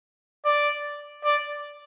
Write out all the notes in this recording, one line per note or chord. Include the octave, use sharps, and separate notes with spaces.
D5
D5